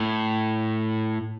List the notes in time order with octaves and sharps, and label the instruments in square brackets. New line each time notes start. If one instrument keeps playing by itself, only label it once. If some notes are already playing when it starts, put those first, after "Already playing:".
Already playing: [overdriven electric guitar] A2